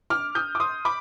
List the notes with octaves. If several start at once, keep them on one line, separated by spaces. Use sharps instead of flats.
D6 F6
D#6 G6
D6
C6 D#6
B5 D6